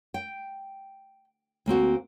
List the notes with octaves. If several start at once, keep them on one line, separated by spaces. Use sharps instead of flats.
G5
D2 A#3 C4 F#4